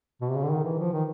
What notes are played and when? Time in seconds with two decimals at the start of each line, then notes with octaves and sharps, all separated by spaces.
0.21 B2
0.29 C3
0.36 C#3
0.43 D3
0.50 D#3
0.64 E3
0.79 F3
0.93 D#3